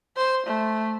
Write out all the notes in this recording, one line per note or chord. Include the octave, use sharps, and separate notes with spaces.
C5
A3